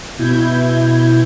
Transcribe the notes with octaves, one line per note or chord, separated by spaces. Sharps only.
B2 E4 G6 G#6